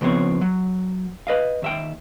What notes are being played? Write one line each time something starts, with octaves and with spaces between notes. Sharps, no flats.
C#3 F3 B3 C4 C#5
F#3
B4 D#5 F5
D#2 E5 G5